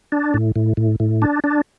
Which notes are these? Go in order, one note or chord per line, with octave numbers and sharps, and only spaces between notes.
D4
A2
A2
A2
A2
D4
D4